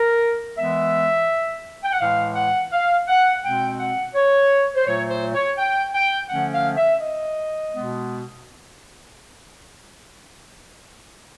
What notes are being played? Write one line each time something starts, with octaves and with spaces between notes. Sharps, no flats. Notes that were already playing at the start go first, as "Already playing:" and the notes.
Already playing: A#4
E3 G#3 B3 E5
G5
F#5
A2 E3 G#3 F5
F#5
F5
F#5
B2 G#3 C4 G5
F#5
C#5
C5
A#2 F#3 A3 C#5
C5
C#5
G5
G5
D3 F3 A3 C#4 F#5
F5
E5
D#5
B2 G#3 B3